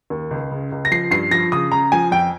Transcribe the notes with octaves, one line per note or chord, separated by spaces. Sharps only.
D#2
C#2
C#3
C#2
A#6
F3 C7
G2 C7
F3 A#6
C#3 D#6
C#3 A#5
F3 G#5
F2 G5